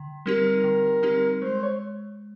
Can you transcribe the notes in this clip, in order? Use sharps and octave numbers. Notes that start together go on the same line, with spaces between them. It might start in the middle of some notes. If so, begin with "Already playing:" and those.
Already playing: D3
G3 C4 D#4 G4 A#4
D3
G3 C4 D#4 G4
G#3 C5
C#5